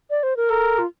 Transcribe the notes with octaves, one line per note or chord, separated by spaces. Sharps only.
D5
C5
A#4
A4 A#4
F4